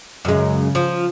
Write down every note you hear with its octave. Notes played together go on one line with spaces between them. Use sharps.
F#2 C#3 G#3
F3